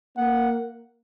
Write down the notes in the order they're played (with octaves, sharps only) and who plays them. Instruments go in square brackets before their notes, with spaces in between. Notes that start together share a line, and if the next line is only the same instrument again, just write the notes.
[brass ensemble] A#3 [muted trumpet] F#5